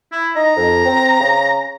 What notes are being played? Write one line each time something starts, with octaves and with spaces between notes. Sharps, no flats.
E4
D#4 A#5
F2
C4
C#3